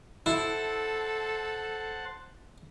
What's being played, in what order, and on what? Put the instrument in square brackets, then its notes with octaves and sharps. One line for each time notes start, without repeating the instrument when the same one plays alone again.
[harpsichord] E4 [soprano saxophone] A4 [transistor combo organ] C5 F#5 A5